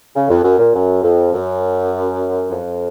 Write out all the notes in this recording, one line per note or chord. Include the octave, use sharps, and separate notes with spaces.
C#3
F2
F#2
A#2
F#2
F2
F#2
F2